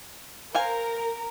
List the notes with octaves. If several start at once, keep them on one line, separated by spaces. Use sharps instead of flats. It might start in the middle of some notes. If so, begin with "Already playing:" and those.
A#4 C5 F5 G#5